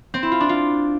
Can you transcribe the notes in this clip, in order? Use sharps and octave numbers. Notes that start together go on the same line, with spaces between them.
C4
E4
F4
D4
F4